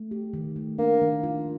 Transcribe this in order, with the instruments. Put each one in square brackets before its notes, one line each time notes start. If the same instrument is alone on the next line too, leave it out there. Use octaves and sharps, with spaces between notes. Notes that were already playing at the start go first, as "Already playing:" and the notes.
Already playing: [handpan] A3
G4
D#3
A3
[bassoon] A#3 [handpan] D4
[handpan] D#3
F4